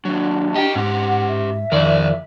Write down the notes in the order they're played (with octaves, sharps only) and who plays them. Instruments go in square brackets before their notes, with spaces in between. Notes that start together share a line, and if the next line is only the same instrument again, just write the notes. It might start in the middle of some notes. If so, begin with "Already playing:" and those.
[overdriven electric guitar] D#2 F#3 [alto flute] D4
[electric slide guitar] G4 [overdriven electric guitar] D#5 G5
[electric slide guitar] G#2 [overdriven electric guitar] C#4 G4 [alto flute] F#5
[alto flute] E5
[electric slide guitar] F2 D#3 D5 [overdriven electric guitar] A#4 C5